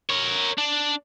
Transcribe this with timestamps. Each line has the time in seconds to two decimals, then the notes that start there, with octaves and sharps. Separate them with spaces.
0.10 A#4 C#5
0.58 D4